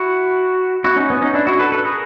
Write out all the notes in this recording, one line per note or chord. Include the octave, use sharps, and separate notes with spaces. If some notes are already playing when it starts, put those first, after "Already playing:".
Already playing: E4 F#4
E4 F#4
C#4 D#4
B3 C#4
C#4 D#4
D4 E4
E4 F#4
A4 B4
A4 B4
G#4 A#4